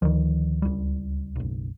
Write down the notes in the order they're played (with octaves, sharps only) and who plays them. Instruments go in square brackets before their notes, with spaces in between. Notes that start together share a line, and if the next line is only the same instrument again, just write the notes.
[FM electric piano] D2 [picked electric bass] D#3 F3
[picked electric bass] C#2 G3
F#1 B1